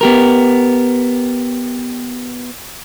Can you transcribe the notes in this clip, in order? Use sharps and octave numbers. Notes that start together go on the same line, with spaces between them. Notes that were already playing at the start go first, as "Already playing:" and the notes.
B3 G4 A#4